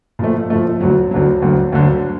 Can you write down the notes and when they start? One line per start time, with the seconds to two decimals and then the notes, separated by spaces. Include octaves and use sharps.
0.19 A#2 F3 A3
0.50 A#2 F3 A3
0.81 D2 D3 F#3
1.11 D2 D3 F#3
1.42 D2 D3 F#3
1.73 D2 D3 F#3